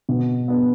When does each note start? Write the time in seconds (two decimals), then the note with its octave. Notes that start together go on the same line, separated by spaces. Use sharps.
0.09 B2
0.48 B3 D4